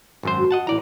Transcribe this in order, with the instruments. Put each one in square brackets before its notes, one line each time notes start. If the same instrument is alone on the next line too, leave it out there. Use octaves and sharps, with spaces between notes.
[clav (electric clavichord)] G#1 F#2 C5
[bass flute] F#4
[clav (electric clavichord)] D#5 F#5 A5
[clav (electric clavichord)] A1 D5 A#5 [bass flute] E4